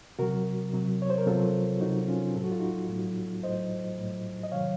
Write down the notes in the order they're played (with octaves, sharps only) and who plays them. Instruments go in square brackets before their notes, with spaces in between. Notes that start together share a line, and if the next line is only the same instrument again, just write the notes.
[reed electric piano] C3 F#3 F#4 A#4
C3 F#3
C#5
C5
A#4
C3 F#3 F4 A4
C3 F#3 D#4 F#4
C#4 F4
A2 F#3 A4
F#4
F4
D#4 F#4
A2 F#3
A2 F#3 C5 D#5
A2 F#3
D#5
C3 D#3 F#3 C#5 F5